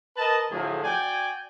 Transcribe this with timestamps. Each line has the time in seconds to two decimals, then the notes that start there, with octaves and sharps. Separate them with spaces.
0.17 A#4 B4 D#5 A5
0.51 A2 D3 F3 F#3 G#4
0.84 F#4 D5 G5 G#5